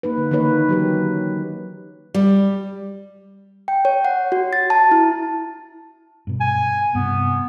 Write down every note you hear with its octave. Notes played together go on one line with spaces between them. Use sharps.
A#3 D#4 B4
D3
D#3 E3 A#3 D#4 B4 C#5
F#3 G4 B4
G3
G5
C#5
F#5
F#4
A6
A5
E4
G2 B2
G#5
G2 C3 B3